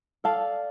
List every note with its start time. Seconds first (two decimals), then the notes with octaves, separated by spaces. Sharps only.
0.24 A4 D5 F5 A5